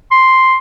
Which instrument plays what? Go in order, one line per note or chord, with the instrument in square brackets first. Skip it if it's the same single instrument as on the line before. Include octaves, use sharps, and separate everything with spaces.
[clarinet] C6